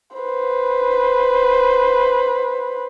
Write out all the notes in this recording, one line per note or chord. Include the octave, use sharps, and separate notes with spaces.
B4 C5